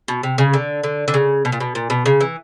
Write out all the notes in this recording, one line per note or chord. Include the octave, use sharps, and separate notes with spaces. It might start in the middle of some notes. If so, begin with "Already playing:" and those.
B2
C3
C#3
D3
D3
D3
C#3
B2
A#2
B2
A#2
B2
C#3
E3